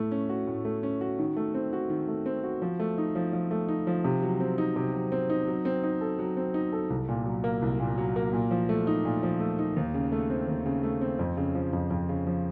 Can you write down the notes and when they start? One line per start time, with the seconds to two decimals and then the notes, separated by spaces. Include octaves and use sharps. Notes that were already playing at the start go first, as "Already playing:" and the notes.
Already playing: A2 A3
0.11 C#4
0.29 F#4
0.47 A2
0.65 A3
0.83 C#4
1.01 F#4
1.19 D#3
1.36 A3
1.54 C4
1.73 F#4
1.90 D#3
2.08 A3
2.26 C4
2.44 F#4
2.62 F3
2.80 A3
2.98 D#4
3.15 F3
3.33 F3
3.51 A3
3.69 D#4
3.87 F3
4.05 C3
4.22 F#3
4.40 C4
4.58 D#4
4.76 C3
4.94 F#3
5.12 C4
5.30 D#4
5.47 F#3
5.65 C4
5.83 D#4
6.01 A4
6.19 F#3
6.37 C4
6.54 D#4
6.73 A4
6.90 C2
7.09 A#2
7.26 F#3
7.44 A#3
7.62 C2
7.80 A#2
7.98 F#3
8.16 A#3
8.33 A#2
8.51 F3
8.69 A3
8.87 D#4
9.05 A#2
9.23 F3
9.40 A3
9.59 D#4
9.76 D#2
9.94 C#3
10.12 A3
10.30 C4
10.48 D#2
10.66 C#3
10.83 A3
11.01 C4
11.19 F2
11.37 C#3
11.55 F3
11.73 F2
11.90 F2
12.09 C#3
12.26 F3